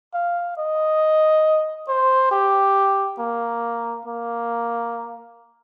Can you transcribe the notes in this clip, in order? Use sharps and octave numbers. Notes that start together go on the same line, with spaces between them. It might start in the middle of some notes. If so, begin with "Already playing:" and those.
F5
D#5
C5
G4
A#3
A#3